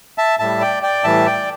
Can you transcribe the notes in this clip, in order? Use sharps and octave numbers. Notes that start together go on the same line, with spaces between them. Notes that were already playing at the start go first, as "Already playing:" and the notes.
E5 A5
A2 G3 E5 A5
D5 G5
D5 G5
A2 E3 G3 E5 A5
D5 G5